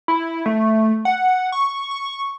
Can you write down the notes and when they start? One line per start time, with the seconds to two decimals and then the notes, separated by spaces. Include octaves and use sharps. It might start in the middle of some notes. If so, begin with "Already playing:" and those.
0.08 E4
0.46 A3
1.05 F#5
1.52 C#6
1.91 C#6